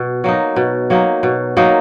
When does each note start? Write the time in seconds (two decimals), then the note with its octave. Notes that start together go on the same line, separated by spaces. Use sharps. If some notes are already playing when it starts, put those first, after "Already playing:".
Already playing: B2
0.24 F#3 A#3 D#4
0.56 B2
0.90 F#3 A#3 D#4
1.23 B2
1.57 F#3 A#3 D#4